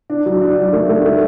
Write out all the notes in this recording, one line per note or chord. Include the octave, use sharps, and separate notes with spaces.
D4
F#3
D4
F#3
A3
A3
A3